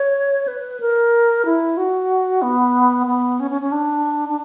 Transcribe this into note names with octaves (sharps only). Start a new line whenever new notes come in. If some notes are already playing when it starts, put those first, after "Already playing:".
Already playing: C#5
B4
A#4
E4
F#4
B3
B3
C#4
C#4
C#4
D4
D4